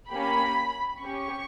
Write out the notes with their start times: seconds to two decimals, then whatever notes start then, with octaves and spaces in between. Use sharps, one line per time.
0.10 A#3 C#4 G4 B5
1.00 C#4 G4 C#6